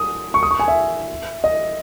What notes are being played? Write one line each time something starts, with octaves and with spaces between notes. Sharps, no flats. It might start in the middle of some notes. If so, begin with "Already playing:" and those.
Already playing: D#6
C#6
D#6
C#6
G#5
E5
D#5